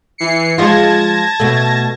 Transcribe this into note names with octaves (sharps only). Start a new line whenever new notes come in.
E3 C7 C#7
F3 G#3 F4 A5 G#6 A#6
B2 A3